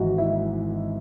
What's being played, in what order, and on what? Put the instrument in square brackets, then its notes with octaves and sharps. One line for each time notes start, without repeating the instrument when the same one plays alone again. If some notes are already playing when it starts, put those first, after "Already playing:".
Already playing: [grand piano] G#1 G#2 E3 F#4
E4